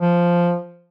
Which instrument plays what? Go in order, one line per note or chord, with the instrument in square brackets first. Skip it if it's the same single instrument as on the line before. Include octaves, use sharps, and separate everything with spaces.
[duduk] F3